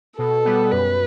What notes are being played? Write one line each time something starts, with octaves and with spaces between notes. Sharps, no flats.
B2 A4
G3 B3
F#2 B4